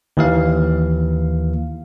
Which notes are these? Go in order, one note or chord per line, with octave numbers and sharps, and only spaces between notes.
D#2 E3 F5